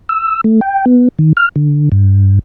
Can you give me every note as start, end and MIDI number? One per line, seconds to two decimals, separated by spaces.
0.09 0.41 88
0.44 0.60 57
0.61 0.85 79
0.86 1.08 59
1.19 1.33 51
1.37 1.49 89
1.56 1.89 50
1.92 2.39 43